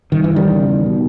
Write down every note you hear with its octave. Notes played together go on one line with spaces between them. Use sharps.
G2 D#3
E3
D#3 G3
E2 C#3
B2